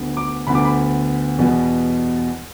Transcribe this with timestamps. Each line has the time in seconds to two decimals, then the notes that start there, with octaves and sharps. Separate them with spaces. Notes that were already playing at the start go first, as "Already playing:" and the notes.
Already playing: D2 D3 B3
0.17 D6
0.47 D2 D3 B3 B5
0.55 D6
0.64 B5
1.39 E2 B2 G3 B3